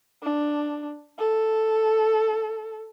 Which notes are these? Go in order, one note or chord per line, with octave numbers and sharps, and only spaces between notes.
D4
A4